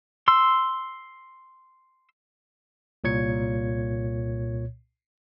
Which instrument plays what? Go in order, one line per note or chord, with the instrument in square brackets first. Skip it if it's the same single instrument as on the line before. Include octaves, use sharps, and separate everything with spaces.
[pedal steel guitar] C6 E6
[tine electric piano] C2 A#2 C#5 G#6 C#7